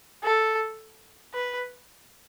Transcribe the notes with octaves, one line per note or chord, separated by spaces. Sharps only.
A4
B4